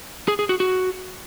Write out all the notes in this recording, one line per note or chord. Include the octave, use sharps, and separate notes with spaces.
G#4
G#4
F#4
F#4